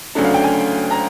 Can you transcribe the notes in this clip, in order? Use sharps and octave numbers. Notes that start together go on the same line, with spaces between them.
D2 C#3 F#3 A3 D4
F5
G5
G#5
A#5